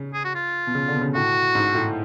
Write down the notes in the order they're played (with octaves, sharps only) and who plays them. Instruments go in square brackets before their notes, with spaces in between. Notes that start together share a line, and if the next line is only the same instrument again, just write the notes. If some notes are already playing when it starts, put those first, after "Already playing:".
Already playing: [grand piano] C#3
[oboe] G#4
F#4
F4
[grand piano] B2
C#3
D3
B2
C#3
[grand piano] A2 [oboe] F#4
[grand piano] G#2
A2